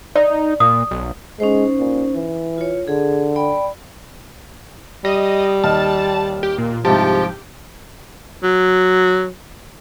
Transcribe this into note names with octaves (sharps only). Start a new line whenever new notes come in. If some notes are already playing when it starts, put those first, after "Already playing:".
D#4 D5
A#2 D#6
B1
G#3 C#4 D#4 C5
A#2
E3
F4 C#5
D3 G#4
D5 G5 B5
G3 D#5
D#2 D#5 A5 F6
G4
A#2
C2 G#2 F3 G4 A5
F#3